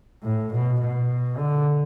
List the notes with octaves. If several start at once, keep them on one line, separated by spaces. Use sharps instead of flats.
A2
B2
B2
D3